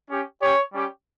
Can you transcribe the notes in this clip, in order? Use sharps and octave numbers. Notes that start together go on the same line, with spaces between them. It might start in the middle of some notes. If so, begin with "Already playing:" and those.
C#4 G4
C#4 G4 C#5
G3 C#4 G4